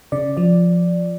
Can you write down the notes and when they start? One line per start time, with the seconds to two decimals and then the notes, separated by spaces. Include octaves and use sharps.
0.12 C#3 D5
0.37 F3 D5